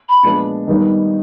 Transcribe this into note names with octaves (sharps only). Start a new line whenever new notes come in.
B5
A#2 F3 G#3 B3 D4
D#3 G3 B3 D#4